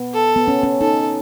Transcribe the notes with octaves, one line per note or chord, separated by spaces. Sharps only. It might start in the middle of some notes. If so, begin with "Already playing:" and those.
Already playing: B3
A4
B3
C#4
C#4
D#4 A4